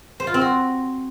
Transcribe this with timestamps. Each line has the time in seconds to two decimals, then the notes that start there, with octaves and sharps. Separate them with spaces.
0.20 C5
0.27 F4
0.34 C4
0.41 F#4